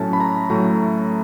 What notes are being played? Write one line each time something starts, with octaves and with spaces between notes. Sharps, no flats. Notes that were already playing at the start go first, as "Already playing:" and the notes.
Already playing: A2 F#3 A3 C#4 A5
B5
A#5
A2 F#3 A3 C#4 A#5